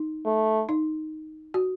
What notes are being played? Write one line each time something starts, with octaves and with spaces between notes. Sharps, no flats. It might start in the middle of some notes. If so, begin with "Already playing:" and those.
Already playing: D#4
A3
D#4
F#4